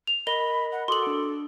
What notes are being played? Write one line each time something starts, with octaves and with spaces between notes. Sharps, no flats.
F7
A#4 D#5 B5 A#6 G7
F#5
F#4 A4 C6 D6 D#6 F#7
D4 D7